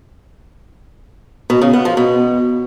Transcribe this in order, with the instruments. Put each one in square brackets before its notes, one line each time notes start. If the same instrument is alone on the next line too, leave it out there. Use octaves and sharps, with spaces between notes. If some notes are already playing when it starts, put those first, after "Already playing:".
[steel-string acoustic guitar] B2
C#3
B3
F3
B2